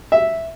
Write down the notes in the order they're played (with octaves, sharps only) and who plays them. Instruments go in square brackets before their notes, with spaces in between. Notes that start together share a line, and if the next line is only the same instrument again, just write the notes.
[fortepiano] E5